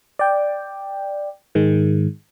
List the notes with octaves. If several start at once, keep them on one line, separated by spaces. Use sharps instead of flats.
D5 G5
G#2 D#3 G#3